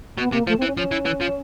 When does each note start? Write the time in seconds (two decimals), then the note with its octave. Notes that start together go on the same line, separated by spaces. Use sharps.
0.18 B2 B3
0.32 C3 A#3
0.47 F3 A3
0.58 C4
0.62 E3
0.66 C#4
0.77 F3 C#4
0.92 E3
1.06 E3
1.21 F3